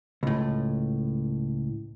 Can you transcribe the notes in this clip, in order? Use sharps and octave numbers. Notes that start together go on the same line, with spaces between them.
C#2 A2